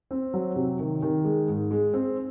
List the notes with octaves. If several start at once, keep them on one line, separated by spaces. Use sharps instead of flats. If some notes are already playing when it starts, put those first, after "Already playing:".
C4
F#3
C3
D#3
D#3
G#3
G#2
G#3
C4